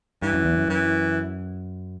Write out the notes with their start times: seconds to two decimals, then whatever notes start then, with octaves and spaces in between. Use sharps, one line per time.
0.22 G2 E3
0.34 F#2
0.45 E2
0.57 F#2
0.69 F#2 E3